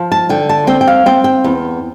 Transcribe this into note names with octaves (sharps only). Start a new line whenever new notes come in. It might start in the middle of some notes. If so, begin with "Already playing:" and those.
Already playing: F3
A5
D3 G5
A5
C4 G5
G5
F5
C4 G5
G5
E2